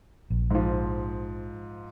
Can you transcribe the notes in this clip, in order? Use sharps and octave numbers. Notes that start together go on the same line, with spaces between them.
A#1
G#2 F3